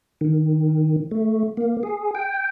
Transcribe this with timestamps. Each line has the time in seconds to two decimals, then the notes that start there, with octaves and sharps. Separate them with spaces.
0.21 D#3
1.11 A3
1.57 A#3
1.83 G#4
2.15 G5